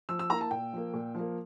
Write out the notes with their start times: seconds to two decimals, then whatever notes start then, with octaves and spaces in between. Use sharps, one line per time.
0.09 F3 E6
0.19 E6
0.30 A#3 E4 A#5
0.41 A5
0.51 A#2 G5
0.73 F3 A#3
0.94 A#2
1.15 F3 A#3